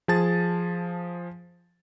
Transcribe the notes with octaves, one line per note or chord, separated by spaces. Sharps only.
F3 G#4 A5 A6